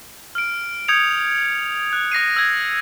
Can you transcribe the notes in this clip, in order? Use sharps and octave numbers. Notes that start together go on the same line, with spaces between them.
F6 D7
D#6 G6 G#6 C#7 F7
F#6
D#6 A#6 C7 D#7
E6 G#6